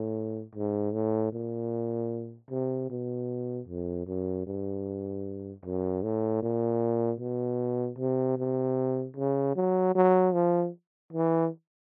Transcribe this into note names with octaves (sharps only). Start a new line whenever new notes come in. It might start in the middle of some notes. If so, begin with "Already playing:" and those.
Already playing: A2
G#2
A2
A#2
C3
B2
F2
F#2
G2
F#2
A2
A#2
B2
C3
C3
C#3
F#3
F#3
F3
E3